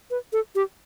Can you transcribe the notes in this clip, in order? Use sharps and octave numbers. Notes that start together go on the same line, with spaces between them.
B4
A4
G4